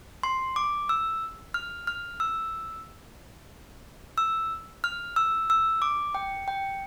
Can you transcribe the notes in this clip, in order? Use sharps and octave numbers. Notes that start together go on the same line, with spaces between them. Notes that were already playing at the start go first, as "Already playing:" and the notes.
C6
D6
E6
F6
F6
E6
E6
F6
E6
E6
D6
G5
G5